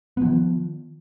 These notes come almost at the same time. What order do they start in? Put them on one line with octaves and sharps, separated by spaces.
B3 F3 D#3